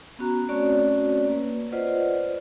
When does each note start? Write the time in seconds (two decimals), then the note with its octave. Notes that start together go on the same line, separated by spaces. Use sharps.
0.19 B3 C#4 F#4 A#5
0.49 A3 C4 C#4 F#4 C#5 D5
1.27 A#3 B4
1.72 F4 B4 C5 D5 D#5 F#5